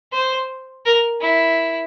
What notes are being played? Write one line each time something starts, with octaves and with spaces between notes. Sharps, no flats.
C5
A#4
E4